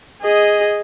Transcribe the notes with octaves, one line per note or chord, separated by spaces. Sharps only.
G#4 D#5